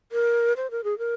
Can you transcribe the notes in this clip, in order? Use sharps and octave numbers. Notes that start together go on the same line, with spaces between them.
A#4
C5
A#4
G#4
A#4